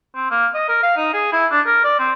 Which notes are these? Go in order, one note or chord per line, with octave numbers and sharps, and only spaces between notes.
C4
A#3
D#5
A#4
F5
D#4
G#4
E4
D4
A#4
D5
C4